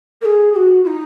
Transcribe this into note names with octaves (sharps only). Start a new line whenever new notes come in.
A#4
G#4
G#4
F#4
F4
D#4